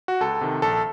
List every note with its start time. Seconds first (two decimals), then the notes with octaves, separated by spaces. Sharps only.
0.08 F#4
0.20 C#2 A4
0.41 C3 D#3
0.62 A#1 A4